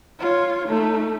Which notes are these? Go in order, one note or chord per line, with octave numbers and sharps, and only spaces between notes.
F4 C#5
A3 D#4